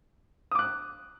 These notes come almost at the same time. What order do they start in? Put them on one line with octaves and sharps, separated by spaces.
D#6 D6 F#6